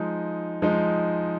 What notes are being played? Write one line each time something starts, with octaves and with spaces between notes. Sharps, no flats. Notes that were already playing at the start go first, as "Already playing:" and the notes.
Already playing: F3 G#3 D#4
F3 G#3 D#4